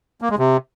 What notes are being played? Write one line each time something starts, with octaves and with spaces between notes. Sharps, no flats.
A#3
G#3
C3